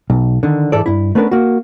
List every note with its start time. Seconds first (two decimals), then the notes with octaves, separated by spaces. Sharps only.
0.10 B1
0.43 D3 D#3
0.72 G#2 E3 A4 D5
0.86 G2 E4
1.15 A3 B3 C#4 D4 A#4 B4
1.31 A#3 F#4